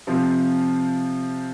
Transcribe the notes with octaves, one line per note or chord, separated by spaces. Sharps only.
C3 F3 C4